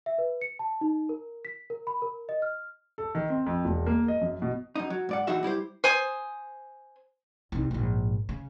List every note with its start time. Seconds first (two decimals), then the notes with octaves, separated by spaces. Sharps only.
0.06 E5
0.18 B4
0.41 C#7
0.59 A5
0.81 D#4
1.09 A#4
1.45 B6
1.70 A#4
1.87 B5
2.02 A#4
2.29 D#5
2.42 F6
2.98 A4
3.15 D#3
3.30 C4
3.46 F2
3.65 E1
3.86 A#3
4.08 D#5
4.21 F#2
4.42 B2
4.75 F#2 D#4
4.90 F#3
5.09 G#2 D5 F#5
5.27 E2 A#2 F#3 D#4 F#4 E5
5.43 G3 E4 G4 C5
5.84 C5 G#5 D#6
7.52 C2 D#4
7.71 A#1 G#2
8.29 C#3